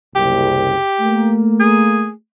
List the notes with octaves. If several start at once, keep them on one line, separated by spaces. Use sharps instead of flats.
F#1 C2 G4
A3 A#3
G#4